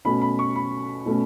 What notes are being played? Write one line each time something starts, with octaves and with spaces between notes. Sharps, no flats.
B2 A3 C#4 B5
B5
C#6
B5
B2 A3 C#4